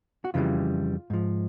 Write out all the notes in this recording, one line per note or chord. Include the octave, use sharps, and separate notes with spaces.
F#4
F2 C#3 E3 G3 F4
G#2 F3